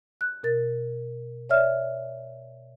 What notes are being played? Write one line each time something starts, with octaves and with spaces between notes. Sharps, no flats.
F#6
B2 A#4 A6
C#5 D5 E5 F6